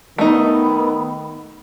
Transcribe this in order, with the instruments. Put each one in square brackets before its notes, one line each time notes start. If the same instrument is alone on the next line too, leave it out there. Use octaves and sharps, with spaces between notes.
[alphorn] D#3 [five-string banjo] A3 D#4 [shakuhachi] B3